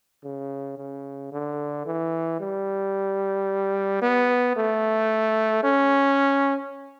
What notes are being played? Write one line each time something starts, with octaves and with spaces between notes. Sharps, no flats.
C#3
C#3
D3
E3
G3
B3
A3
C#4